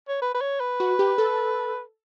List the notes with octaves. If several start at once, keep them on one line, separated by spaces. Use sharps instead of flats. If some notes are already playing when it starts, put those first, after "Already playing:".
C#5
B4
B4
C#5
B4
F#4
G4
A4